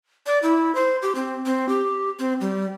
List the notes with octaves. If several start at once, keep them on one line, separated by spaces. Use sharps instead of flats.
D5
E4
C5
G4
C4
C4
G4
C4
G3